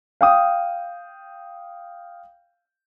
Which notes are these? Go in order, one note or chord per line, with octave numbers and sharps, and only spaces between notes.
F5 G5 D#6